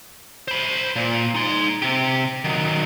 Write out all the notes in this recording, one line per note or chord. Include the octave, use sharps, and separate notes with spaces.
C5 B5
A#2
D#4 C6
C3 G4
D#3 F#3